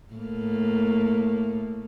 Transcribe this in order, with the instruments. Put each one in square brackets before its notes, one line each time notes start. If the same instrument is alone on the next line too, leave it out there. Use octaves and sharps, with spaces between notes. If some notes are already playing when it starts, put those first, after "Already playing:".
[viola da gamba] A2 A#3